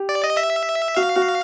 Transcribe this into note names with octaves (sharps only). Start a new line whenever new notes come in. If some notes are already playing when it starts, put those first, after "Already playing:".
Already playing: G4
D5
D#5
E5
F#4 F5
F#4